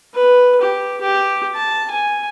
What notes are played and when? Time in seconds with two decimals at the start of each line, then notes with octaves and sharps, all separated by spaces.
0.14 B4
0.61 G4
1.01 G4
1.55 A5
1.90 G#5